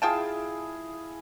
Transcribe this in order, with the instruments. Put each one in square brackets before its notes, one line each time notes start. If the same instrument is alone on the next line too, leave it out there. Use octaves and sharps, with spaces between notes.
[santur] E4 G#4 F5 [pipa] F4 G5 A5